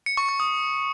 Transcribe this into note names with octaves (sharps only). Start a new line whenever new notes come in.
C#7
C#6
C#6
D#6